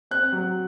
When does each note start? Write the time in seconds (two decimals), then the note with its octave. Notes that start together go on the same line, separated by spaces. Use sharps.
0.11 C4 F#6
0.32 F#3